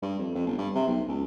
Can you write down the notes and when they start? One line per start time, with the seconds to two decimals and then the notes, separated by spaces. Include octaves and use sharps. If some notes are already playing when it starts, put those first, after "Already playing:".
0.03 G2
0.19 F2
0.35 F2
0.47 G1
0.58 G2
0.75 C3
0.87 B1
1.08 C#2